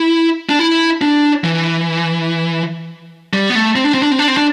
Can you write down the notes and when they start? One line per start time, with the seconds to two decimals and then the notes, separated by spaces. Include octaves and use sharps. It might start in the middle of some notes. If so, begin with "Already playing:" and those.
Already playing: E4
0.49 D4
0.59 E4
1.01 D4
1.44 E3
3.33 G3
3.50 B3
3.55 A3
3.76 C4
3.84 D4
3.94 C4
4.02 D4
4.11 C4
4.19 D4
4.28 C4
4.37 D4